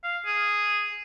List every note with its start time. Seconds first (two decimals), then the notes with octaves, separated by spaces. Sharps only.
0.04 F5
0.26 G#4